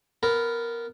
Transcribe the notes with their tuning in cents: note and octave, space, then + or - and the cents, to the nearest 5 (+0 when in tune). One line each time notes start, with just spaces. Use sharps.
B3 +10 A#4 +0